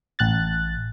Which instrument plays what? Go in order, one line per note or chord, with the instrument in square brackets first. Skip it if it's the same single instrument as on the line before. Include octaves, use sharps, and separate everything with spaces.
[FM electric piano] A1 F#6 A6